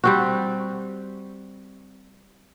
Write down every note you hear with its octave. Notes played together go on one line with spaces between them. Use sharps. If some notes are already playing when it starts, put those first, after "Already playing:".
G3 C4 F#4